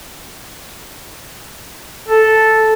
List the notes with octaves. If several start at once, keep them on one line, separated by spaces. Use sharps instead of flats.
A4